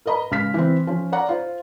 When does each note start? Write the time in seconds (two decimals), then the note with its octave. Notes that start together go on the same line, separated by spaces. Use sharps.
0.06 A#4 B4 D#5 A#5 B5
0.31 C#2 C#3 F6 B6
0.54 E3 C4
0.87 F3 C#4
1.12 C#5 D5 F#5 A#5
1.29 F4 C5